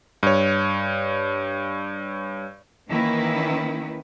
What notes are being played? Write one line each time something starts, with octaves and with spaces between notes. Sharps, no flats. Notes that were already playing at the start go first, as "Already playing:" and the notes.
G2 C#5
D#3 E3 A#3 C#4 E4 B4